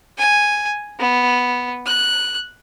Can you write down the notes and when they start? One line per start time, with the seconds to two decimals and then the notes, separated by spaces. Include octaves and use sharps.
0.18 G#5
0.99 B3
1.86 F#6